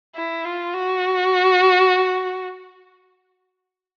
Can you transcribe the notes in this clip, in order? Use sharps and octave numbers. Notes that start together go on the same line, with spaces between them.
E4
F4
F#4